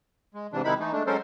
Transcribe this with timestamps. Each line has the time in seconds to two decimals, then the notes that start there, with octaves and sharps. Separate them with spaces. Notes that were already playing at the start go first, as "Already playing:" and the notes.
0.34 G#3
0.53 G#2 C3 E3 D4
0.65 C3 D#3 G#3 D#4 E4 B5
0.79 E3 A3 D#4
0.92 G#3 A3 D4
1.07 F#3 G#3 C#4 A4 A#4 C5